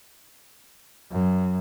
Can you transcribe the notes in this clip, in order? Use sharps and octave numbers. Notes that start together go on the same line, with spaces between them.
F#2